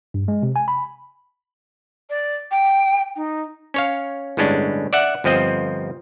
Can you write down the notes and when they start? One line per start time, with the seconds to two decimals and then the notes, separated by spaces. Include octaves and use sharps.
0.14 G2
0.28 G#3
0.43 C3
0.56 G#5
0.68 B5
2.10 D5
2.51 G5
3.16 D#4
3.74 C#4 C#5 F5
4.37 G1 A2 G#3 C#4 D4
4.93 D5 E5 F#5
5.24 G1 F3 C4 D#5